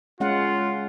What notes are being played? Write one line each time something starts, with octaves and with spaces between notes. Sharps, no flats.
G#3 C#4 F4 F#5